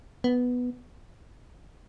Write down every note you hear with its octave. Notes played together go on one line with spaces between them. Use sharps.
B3